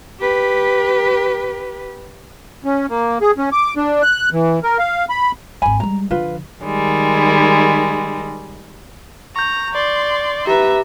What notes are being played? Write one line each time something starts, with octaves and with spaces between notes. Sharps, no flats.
G4 B4
C#4
A#3
G#4
C#4
D6
D4
F#6
E3
A#4
F5
B5
G#1 D#2 G#5 B5
G3 G#3 A#5
D3 F3 F4 B4
D#3 G3 G#3
A#5 C#6 G6
D5 C6
G4 B4 E5 A#5